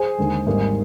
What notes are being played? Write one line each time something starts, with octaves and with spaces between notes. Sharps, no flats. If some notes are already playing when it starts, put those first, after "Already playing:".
Already playing: G#4 C5
D#2 D3 G#3
G#1 G#2 G3 A#3